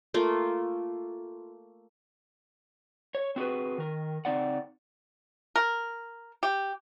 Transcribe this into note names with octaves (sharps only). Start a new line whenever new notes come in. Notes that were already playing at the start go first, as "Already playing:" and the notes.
A3 A#3 F4
C#5
C4 F#4 G#4 B4
D#3 A#4
C#3 C4 D#4 D5 F#5
A#4
G4